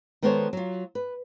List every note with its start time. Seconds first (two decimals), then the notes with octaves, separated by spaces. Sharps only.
0.23 D#3 G#3 B3 A4 C5 C#5
0.53 F#3 F4
0.95 B4